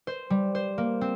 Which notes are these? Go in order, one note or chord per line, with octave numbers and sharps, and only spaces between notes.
C5
G3
C5
A#3
C4